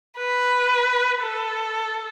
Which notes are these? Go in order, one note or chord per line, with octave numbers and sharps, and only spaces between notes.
B4
A4